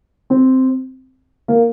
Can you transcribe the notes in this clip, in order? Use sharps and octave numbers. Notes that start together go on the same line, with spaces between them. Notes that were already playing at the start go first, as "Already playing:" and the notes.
C4
A#3